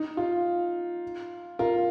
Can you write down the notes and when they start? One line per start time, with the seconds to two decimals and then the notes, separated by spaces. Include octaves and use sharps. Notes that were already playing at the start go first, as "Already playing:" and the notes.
Already playing: D#4
0.17 F4
1.59 F4 A#4